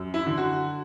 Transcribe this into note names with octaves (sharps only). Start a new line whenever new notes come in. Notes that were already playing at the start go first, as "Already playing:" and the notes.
Already playing: F#2
E4
D3
F#4